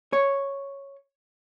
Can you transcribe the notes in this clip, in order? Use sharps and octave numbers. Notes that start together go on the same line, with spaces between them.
C#5